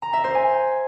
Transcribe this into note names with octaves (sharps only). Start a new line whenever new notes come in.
A#5
E5
C5
G#5